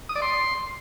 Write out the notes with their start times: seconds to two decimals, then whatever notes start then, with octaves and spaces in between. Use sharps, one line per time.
0.09 D#6
0.16 D5
0.22 C6